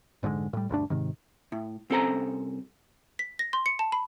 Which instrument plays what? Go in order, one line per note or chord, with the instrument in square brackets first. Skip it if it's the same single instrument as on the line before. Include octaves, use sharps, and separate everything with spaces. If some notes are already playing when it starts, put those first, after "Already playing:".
[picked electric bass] F1 G#2 D3 G#3
A2 G3
E1 D2 G2 D4
G#2 C3 D#3
[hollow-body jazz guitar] A2
C2 C4 C#4 A4 C5 A#5
[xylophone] B6
A#6
C6
C#7
A5
B5